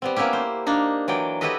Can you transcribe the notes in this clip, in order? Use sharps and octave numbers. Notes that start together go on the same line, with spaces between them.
G3 B3 C4
A#3 B3 C#4 E4 G4
C5
A#3 D4 D#4
E3 F#3 D5 G5
E4 F#4 G4 A4 B4 D#5